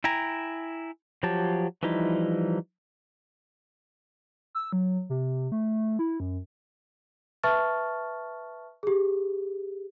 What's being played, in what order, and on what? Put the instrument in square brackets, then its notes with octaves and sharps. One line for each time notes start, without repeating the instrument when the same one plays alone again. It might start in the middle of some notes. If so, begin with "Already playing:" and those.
[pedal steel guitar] E4 G5 G#5 A#5
F3 F#3 G4 C#5 A5
E3 F3 G3 D#4 E4
[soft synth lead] E6
F#3
C3
A3
E4
F#2
[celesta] B4 E5 A5 C#6 F6 A6
G4 G#4